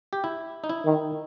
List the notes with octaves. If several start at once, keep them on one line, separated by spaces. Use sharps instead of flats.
G4
E4
D#4
E4
D#3